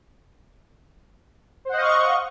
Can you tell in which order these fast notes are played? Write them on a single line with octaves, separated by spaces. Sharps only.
C5 F#5 D#5 F5 C#6